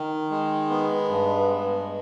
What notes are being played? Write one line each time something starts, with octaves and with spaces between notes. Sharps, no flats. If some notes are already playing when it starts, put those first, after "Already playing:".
Already playing: D#3
G#3
B3
G2
G#3